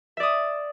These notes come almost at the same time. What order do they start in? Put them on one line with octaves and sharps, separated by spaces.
E5 D5 D#6